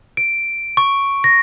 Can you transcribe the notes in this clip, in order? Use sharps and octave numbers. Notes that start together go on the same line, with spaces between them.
D7
C#6
A#6